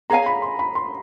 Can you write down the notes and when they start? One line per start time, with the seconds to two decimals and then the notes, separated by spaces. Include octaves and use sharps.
0.10 G#4 C#5 F5 G#5 A#5
0.26 B5
0.42 C6
0.59 B5
0.75 C6